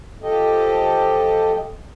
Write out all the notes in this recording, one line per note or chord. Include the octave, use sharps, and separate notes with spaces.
F3 G4 A4 D#5